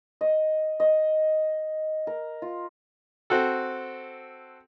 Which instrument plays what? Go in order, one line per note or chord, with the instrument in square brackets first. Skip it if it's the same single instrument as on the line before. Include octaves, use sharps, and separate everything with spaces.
[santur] D#5
D#5
A#4
F4
[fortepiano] C4 F#4 A4